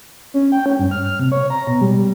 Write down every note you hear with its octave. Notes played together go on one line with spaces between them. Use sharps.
C#4
G5
C#4
G2
F6
F6
C3
C#5
A#5
B2
G3
G3